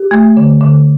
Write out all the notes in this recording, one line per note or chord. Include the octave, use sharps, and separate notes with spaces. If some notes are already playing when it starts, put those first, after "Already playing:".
Already playing: G4
A3
D3
D3